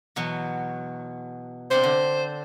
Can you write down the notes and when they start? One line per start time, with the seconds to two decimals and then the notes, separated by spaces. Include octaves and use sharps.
0.16 E2 B2 F#3
1.71 C3 C4 D4 C5
1.84 D3